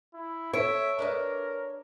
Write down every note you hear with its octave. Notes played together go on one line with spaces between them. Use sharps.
E4
A4 C#5 E5 D7
D4 A#4 B4 D#5